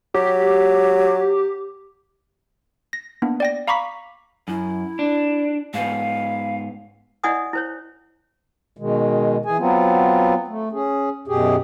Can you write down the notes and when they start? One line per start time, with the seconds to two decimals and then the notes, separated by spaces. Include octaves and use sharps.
0.15 F#3 G4
2.93 A#6
3.22 A#3 B3 D4 E4
3.40 D5 G5 A#6
3.68 F5 A#5 B5 C#6 D6 B6
4.48 F#2 E4
4.99 D4
5.74 G#2 B3 F5
7.24 E4 D5 D#5 F#5 G#5 D#6
7.53 E4 C5 C#5
8.77 B2 D#3 G#3
9.45 E3 G#4 G#5
9.58 F#3 B3 C4 F4
10.47 A3
10.72 C#4 G#4
11.28 F#2 B2 G4 G#4